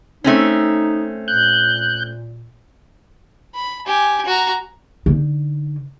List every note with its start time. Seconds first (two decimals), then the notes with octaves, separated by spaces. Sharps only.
0.24 A3 C4 C#4 D#4
1.28 A#2 F#6 G6
3.55 B5
3.86 G4 G#5
4.25 F#4 A#5
5.06 D3 D#4